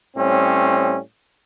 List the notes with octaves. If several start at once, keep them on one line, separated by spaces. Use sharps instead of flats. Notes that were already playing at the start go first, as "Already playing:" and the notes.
A2 G3 C4 C#4